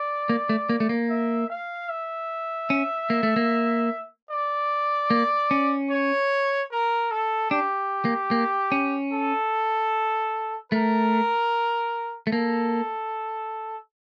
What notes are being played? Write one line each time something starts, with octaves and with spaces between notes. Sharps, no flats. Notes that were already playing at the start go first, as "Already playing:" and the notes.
Already playing: D5
A#3
A3
A#3
A3
A#3
E5
F5
E5
C#4
A#3
A3
A#3
D5
A#3
C#4
C#5
A#4
A4
D4 G4
A#3
A#3
C#4
A4
A3 A#4
A3
A#3 A4